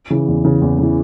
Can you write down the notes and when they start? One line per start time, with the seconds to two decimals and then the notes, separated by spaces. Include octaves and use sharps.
0.10 C#3 E3
0.28 E2
0.45 C#3 E3
0.62 E2
0.79 C#3 E3